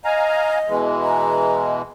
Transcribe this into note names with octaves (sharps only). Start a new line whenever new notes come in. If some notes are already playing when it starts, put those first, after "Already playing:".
D#5 F5 G#5 A#5
B2 E3 G#3
A#5